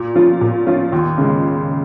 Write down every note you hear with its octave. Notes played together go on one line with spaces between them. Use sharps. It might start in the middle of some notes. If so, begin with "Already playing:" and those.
Already playing: A#2
F3 C#4 F4
A#2
F3 C#4 F4
D#2
C#3 G#3